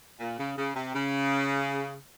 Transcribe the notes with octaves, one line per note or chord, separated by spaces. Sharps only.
A#2
C#3
C#3
C3
C#3